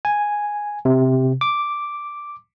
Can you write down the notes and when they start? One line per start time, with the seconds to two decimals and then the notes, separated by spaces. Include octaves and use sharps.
0.05 G#5
0.85 C3
1.41 D6